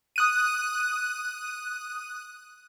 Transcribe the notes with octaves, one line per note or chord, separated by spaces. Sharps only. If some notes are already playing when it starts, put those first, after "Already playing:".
D#6 F#6 D#7